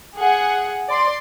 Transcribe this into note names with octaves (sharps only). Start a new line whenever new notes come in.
G#4 F#5
D5 C6